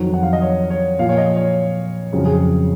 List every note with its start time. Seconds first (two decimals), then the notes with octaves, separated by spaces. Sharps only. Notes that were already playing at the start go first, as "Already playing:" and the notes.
Already playing: F2 D#3 F#3
0.14 F#5
0.23 F5
0.33 D#5
0.42 C#5
0.70 C#5
0.99 A#2 F3 F5
1.09 C#5
1.18 D#5
1.36 C#5
2.13 F2 C#3 F#3
2.25 G#4